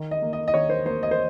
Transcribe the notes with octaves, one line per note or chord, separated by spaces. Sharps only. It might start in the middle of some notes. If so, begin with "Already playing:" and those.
Already playing: D#3
D#5
A#3
D#5
D#5
D#3 C#5
C5
A#3 C5
D#5
C5